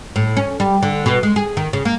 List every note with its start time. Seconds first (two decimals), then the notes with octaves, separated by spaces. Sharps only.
0.16 A2
0.37 C#4
0.60 G3
0.83 D3
1.06 B2
1.23 G#3
1.36 G#4
1.57 D#3
1.73 C#3
1.85 A#3